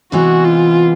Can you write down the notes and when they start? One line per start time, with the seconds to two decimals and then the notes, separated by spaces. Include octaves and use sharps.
0.12 C3 E3 G#3 B3 F#4
0.44 F4